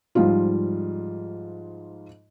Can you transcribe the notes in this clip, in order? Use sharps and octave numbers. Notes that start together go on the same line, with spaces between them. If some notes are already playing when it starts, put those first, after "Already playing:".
G#2 F3 G3 F4